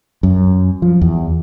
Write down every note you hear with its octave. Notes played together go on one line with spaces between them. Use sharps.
F#2
F3
E2